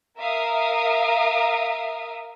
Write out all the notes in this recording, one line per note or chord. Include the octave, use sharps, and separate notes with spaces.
A#4 E5 F5 D#6